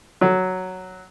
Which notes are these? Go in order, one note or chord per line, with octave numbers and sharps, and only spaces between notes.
F#3